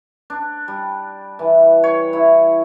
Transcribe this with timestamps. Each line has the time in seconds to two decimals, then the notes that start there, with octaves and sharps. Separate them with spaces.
0.30 D4
0.68 G3
1.39 E3
1.84 C#5
2.13 E4